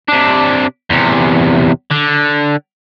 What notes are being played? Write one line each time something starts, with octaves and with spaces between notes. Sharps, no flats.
C3 D4
E2 C3
D3